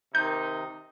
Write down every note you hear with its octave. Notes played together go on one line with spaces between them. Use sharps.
C3 D#3 D#4 G6